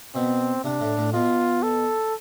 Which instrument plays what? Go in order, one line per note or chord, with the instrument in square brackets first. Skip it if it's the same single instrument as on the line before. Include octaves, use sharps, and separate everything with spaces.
[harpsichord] B2 [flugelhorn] C4
[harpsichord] C3 [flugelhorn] D4
[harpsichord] A2
A2
[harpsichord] B2 [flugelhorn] F4
[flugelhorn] A4